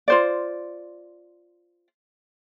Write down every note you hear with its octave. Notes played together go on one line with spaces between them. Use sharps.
F4 C5 D5